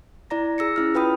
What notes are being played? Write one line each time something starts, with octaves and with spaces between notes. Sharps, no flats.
E4 D5 A#5 A#6
G#4 E6 A#6 C#7
C#4 E4 F6
F4 B4 G5 B5 D#6